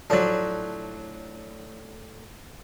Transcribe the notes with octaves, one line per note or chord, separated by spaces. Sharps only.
A2 F3 F#3 D4